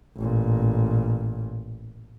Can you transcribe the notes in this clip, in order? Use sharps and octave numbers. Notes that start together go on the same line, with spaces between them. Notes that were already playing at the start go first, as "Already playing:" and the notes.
A1 A#2